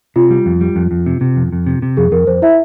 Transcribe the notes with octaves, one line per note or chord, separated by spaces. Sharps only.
C3 F4
G3
F2
G3
F2
F2
C3
C3
F2
F2
C3
C3
F2 G#4
F2 A#4
F2 C5
E4 E5